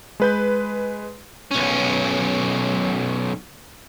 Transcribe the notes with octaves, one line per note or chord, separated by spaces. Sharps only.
G#3 B4 G6
B1 C#4